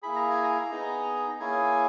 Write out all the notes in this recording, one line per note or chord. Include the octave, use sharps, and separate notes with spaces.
A#3 E4 G#4 B5
A#5
G#5
A#5
B3 D#4 G#4
A#3 C#4 E4 G#4 G#5